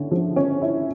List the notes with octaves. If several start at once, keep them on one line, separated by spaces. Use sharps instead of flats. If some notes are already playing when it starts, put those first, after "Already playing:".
Already playing: D3 C#4 E4
F3
C#4
E4